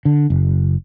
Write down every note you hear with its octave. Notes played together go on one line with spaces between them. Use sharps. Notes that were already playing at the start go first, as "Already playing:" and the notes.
D3
F#1